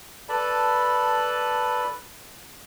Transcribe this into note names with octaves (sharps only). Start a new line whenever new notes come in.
A4 B4 D5 A5 B5